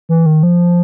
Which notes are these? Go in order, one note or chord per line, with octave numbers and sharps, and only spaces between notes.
E3
D#3
F3